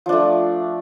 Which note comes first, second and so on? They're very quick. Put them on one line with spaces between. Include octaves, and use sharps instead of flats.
F3 D4 A3